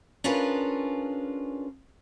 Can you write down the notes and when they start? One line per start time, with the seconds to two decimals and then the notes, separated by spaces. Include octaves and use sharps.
0.24 C#4 D4 F4 G#4 A#4 B4